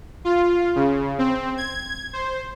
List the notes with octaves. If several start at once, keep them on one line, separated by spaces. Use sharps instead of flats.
F4
C#3
C4
G#6
C5